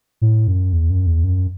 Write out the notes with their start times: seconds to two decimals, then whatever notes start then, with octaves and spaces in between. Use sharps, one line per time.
0.21 A2
0.47 F#2
0.73 E2
0.90 F#2
1.07 E2
1.24 F#2